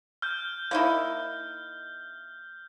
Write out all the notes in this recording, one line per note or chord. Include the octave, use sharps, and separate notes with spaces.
F6 G6
A#3 D#4 E4